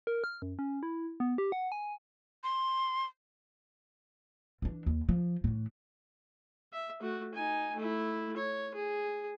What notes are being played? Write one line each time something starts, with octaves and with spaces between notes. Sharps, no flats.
A#4
F6
F#2
C#4
E4
B3
G4
F#5
G#5
C6
E3 D4
D#2
F3
A2 E3
E5
A3 F#4
D#4 G#5
A3 E4
C#5
G#4